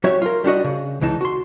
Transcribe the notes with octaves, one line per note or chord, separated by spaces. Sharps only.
F#3 F#4 G4 C#5 E5
F4 A#4
G3 D4 F#4 D#5
C#3
C#2 E3 D#4 A5
F#4 C6